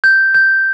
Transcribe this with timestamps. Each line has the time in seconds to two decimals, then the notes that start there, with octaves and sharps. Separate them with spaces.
0.04 G6
0.34 G6